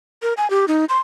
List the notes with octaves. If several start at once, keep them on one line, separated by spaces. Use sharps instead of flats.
A#4
G#5
G4
D#4
C6